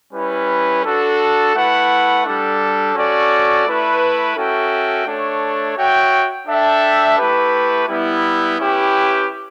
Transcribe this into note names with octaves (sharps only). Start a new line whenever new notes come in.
G3 C#4 E4 B4
D4 F#4 A4
A3 E4 B4 F#5
G3 D4 A4
C#4 F#4 A4 D5
A3 E4 B4
C#4 F#4 A4 E5 G5
A3 D4 A4 C#5
F#4 C#5 E5 G5
D4 A4 E5 G5
A3 E4 G4 B4
G3 B3 E4
C#4 E4 G4 B4